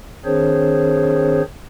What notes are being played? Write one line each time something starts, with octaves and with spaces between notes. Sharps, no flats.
D#3 C4 D4 G#4 C5 C#5